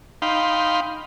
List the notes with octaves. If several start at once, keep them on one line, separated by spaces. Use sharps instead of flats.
D#4 F5 G5 B5 C6